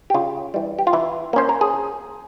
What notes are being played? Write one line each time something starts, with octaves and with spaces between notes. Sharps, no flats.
G4
C#3 F4
E3 G3
G4
F4
E3 E4
A#3 C#4 C5
A#4
G#4